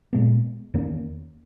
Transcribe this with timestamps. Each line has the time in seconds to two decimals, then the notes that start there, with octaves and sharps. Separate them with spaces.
0.13 A#2 G#3 B3
0.74 E2 D#3 A#3 C#4